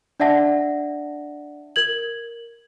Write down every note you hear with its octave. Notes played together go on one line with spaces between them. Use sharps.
D4 D5 E5 F#5 A5 A#6
A#4 G#6 F#7